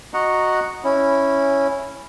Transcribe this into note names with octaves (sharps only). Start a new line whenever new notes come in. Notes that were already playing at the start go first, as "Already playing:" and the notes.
F#4 D#5 F#5 A#5
C#4 E4